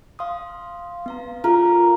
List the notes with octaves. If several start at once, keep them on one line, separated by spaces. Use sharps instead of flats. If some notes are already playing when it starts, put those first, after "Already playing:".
F5 C6 D#6
B3 F5 A#5
F4 A#4 F5